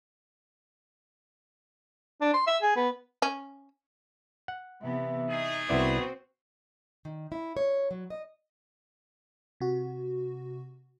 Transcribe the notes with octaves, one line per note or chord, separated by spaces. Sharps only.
D4
C6
E5
G#4
B3
C#4
F#5
C3 E3 B3 E5
A3 D#4 G#4 D#5
C2 B3 C4 E4 F#4 C5 D5
D#3
E4
C#5
F#3
D#5
C3 F#4